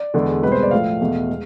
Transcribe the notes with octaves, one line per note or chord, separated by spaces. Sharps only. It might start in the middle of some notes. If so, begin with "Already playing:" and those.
Already playing: D5
E2 D3 G#3
C2 B2 G#3 B4
C5
D5
A2 F3 A3 F5
E2 B2 A3
G#3